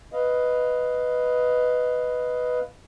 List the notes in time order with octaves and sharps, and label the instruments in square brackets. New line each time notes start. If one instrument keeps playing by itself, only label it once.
[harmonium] B4 D#5 F5